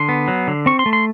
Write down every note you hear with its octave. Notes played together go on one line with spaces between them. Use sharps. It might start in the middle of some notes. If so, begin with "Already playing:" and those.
Already playing: D3 C6
B3
F#3
D3
C4 C#6
C6
A3
C6